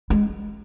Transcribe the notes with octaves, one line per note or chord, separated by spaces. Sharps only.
G#3